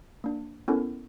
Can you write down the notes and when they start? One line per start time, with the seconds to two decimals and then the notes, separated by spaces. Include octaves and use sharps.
0.24 A#3 D4
0.68 B3 C#4 E4 A4 A#4